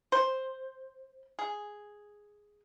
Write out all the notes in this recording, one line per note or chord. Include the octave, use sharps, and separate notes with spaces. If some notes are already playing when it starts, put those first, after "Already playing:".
C5
G#4